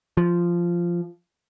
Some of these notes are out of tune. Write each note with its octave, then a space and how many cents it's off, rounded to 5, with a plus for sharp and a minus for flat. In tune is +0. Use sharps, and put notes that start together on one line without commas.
F3 -10